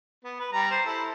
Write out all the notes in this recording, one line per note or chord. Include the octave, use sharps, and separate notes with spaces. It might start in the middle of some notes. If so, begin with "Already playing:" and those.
B3
B4
G3 A#5
C5
E4 A4